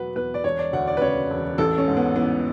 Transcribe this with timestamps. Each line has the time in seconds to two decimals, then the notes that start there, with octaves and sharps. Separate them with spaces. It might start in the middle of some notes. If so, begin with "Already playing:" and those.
Already playing: E2 B2 F#3 B4 F#5
0.16 E2 B4
0.34 D5
0.44 E1 C#5
0.59 D5
0.73 D2 F#5
0.87 D5
0.97 B4
1.01 C#3 C#5
1.30 E1
1.58 A1 A4
1.78 C#4
1.88 G#2
1.97 B3
2.16 E3 B3